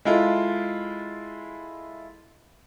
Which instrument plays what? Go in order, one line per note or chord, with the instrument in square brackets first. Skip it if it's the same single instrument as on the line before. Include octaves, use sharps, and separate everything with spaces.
[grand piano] G#3 E4 F4 A4